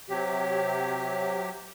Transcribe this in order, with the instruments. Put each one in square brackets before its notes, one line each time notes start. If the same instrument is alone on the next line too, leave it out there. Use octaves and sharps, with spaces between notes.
[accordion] C3 F#3 G4